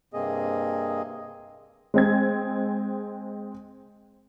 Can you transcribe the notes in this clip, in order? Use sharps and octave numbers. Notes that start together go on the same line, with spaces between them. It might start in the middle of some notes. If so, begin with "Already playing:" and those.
G2 C3 A#3 C4 G#4 D#5
G#3 C4 G#6